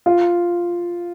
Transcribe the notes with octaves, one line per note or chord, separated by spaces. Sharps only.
F4